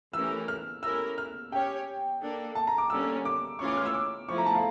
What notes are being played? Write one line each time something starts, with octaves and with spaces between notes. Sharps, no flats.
E3 A3 C#4 G4 A#4 E6
F6
A3 C#4 E4 G4 A#4 E6
F6
C#4 G4 C#5 G5
A#3 D4 A4
A5
A#5
D6
D3 G3 A#3 C#4 G4 E6
D6
E3 A3 C#4 F4 C#5 C#6
D6
F6
E6
D6
F3 A3 E4 C#6
A#5
A5
F5